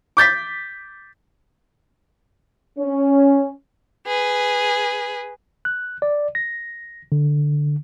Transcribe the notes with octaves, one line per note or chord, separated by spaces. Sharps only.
D6 G6 A6 B6
C#4
G#4 B4
F#6
D5
A#6
D3